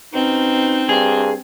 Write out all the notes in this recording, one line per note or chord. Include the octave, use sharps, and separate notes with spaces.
B2 C4 C#4 D#4
G2 G#4